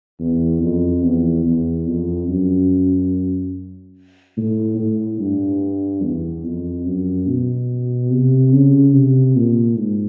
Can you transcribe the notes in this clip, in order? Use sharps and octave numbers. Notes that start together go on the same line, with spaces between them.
E2
F2
E2
E2
F2
F#2
A2
A2
G2
E2
F2
F#2
B2
C3
C#3
C3
A#2
G#2